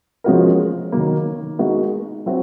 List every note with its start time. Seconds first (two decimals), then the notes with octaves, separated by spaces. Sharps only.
0.24 F3 G#3 C#4 F#4 A#4
0.92 D#3 F#3 A#3
1.59 G#3 D#4 F#4 A#4
2.26 F#3 C4 F#4